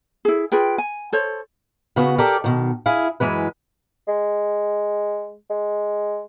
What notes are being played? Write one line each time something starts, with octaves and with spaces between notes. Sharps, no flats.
E4 G#4
F4 G#4 B4 G5
G#5
A4 C5 C#5
C#3 B3 F#4
G4 A4 A#4 D5
B2 D#3
E4 G#4 F5
F#2 E3 G#3 B4
G#3
G#3